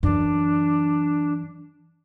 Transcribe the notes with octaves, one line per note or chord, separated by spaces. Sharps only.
F#2 E3 D4